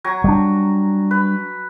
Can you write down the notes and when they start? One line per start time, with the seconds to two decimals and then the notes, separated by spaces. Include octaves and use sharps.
0.04 F#3 G#5 A#5
0.24 G3 D4
1.11 B4